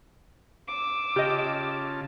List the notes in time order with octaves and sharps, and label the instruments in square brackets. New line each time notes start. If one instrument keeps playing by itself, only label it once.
[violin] D6 E6
[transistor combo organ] C#3 F4 A5 [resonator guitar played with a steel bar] G4 D#5